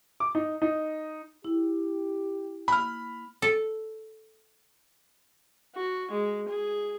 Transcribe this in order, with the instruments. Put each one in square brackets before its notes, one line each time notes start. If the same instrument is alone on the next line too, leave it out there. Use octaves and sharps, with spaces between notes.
[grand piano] D6
D#4
D#4
[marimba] E4 [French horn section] G4
[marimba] A#3 F#6 [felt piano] B5 F6
[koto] A4
[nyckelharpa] F#4
G#3
G#4